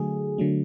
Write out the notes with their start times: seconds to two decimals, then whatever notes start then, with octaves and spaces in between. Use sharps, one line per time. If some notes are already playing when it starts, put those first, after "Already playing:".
Already playing: D3 F#3 A3 G#4
0.38 D3 F#3 A3